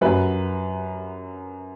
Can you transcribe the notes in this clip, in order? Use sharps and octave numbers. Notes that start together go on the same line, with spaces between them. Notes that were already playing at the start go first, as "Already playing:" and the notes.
F#2 F#3 B4